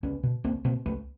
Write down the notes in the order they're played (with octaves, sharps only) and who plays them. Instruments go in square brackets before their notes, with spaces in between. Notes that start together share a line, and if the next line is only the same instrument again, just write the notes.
[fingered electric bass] C#2 B3 C#4
B2
C#2 A#3 C4
B2 A#3 C4
C#2 A3 B3